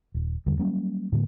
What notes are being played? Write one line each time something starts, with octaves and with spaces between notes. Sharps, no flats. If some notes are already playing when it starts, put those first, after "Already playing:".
D#1
E2 G2 D3 G3
F#3 G3 A#3 C#4
A2 D3 G#3 A#3